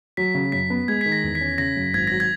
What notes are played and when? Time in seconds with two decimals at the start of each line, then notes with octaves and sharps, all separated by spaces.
0.17 F#3 B6
0.35 C#3
0.52 F#2 B6
0.70 B3
0.88 G#3 G#6
1.01 D#3 B6
1.12 A#6
1.24 E2
1.35 B6
1.41 C#4
1.58 C#3 A#6
1.76 F#2
1.94 G#1 G#6
2.07 F#3 A#6
2.20 G#6